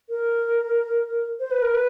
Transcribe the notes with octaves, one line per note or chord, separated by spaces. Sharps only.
A#4
C5
B4
A#4
B4